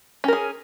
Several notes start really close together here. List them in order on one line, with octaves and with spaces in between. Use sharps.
C#4 A#4 G#4